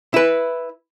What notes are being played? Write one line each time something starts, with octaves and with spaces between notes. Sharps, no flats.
E4 B4